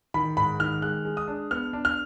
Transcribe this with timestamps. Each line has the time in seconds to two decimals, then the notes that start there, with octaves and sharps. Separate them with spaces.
0.14 D#3 B5
0.37 G#2 B5
0.59 D#3 F6
0.82 G#3 F#6
1.05 G#3
1.17 D#6
1.28 D4
1.51 B3 F6
1.73 D4
1.85 F6